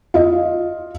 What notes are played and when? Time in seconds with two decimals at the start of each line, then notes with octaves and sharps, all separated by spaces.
0.14 F4 D#5